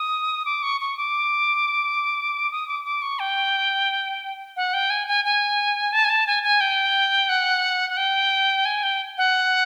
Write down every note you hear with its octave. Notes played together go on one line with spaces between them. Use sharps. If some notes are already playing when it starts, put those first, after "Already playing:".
Already playing: D#6
D6
C#6
C#6
D6
D#6
D6
D6
C#6
G5
F#5
G5
G#5
G#5
G#5
A5
G#5
A5
G#5
G#5
G5
F#5
F#5
G5
G#5
G5
F#5